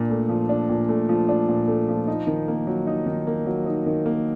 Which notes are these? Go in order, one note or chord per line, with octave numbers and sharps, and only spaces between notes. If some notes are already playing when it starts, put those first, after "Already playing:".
Already playing: A#2 D4
A3
F3
D4
A#2
A3
F3
D4
A#2
A3
F3
D#4
D#3
A#3
F#3
D#4
D#3
A#3
F#3
D#4
D#3
A#3